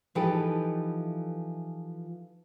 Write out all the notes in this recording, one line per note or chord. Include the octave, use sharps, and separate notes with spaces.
E3 F3 D#4 G4 A4 B4